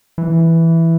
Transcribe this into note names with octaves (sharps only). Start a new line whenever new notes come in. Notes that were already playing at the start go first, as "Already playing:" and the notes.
E3